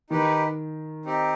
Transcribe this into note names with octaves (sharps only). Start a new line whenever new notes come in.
D#3 D#4 G4 B4
C4 D#4 G4